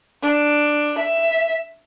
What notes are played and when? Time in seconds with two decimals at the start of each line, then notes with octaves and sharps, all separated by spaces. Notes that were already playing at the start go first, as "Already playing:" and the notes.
0.23 D4
0.98 E5